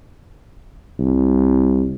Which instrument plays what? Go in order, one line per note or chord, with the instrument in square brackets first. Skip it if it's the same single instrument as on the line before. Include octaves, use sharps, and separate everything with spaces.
[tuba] C2